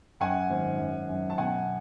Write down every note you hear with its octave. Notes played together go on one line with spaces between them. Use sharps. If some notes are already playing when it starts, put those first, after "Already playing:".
F#2 F#5 G#5
G#1
F#2
F#2
A5
B2 F#5 G#5